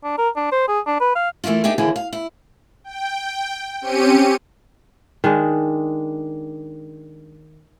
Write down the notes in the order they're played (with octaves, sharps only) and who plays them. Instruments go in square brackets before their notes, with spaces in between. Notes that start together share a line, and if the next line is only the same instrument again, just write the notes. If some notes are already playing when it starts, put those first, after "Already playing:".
[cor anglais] D4
A#4
D4
C5
G#4
D4
B4
F5
[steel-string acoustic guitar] E3 A3 A#3 E4 F4
D4 D#4 G4 G#4 E5
D#2 D3 E3 E4 G#4
F5
E4
[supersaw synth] G5
C4 C#4 G4 C#7 D#7
[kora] D#3 G#3 D4